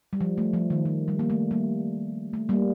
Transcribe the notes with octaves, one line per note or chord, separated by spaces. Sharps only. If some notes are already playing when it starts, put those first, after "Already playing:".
G3
F3
A3
F3
D#3
F3
G3
A#3
A3
G3 A#3
A3
G3 A#3